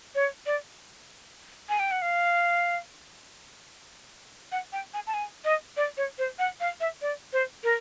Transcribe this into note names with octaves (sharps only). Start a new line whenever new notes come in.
C#5
D5
G#5
G5
F#5
F5
F#5
G5
G#5
A5
G#5
D#5
D5
C#5
C5
F#5
F5
E5
D5
C5
A#4